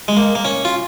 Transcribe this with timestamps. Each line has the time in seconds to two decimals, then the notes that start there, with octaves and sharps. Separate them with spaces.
0.08 G#3
0.17 A#3
0.35 A#3
0.45 C#4
0.65 F4